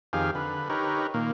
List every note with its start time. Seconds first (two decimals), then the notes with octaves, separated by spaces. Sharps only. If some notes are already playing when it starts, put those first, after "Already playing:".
0.13 F2 D#3 G4 G#4 F5
0.35 D3 B4
0.70 D#4 G4 A#4 B4 C#5
1.14 A#2 D#3 A#3